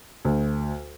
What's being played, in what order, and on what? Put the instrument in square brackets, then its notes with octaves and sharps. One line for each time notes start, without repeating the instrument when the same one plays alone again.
[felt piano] D2